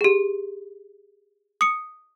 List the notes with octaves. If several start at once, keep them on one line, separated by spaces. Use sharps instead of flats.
G4 G#4
D#6 C#7